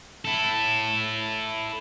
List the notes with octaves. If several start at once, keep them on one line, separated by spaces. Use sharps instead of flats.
E4 A4